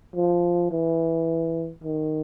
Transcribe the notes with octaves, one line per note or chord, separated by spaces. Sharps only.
F3
E3
D#3